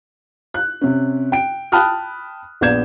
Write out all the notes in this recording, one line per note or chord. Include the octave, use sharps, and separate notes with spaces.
F#6
C3 C#4
G5 D7
G5 A5 B5 D#6 F6 F#6
A#1 B3 D5 G6 G#6 E7